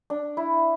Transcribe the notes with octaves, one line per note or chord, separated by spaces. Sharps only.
D4
E4